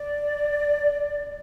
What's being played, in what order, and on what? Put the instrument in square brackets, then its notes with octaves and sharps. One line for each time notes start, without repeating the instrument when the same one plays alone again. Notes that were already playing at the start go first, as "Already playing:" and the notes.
Already playing: [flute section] D5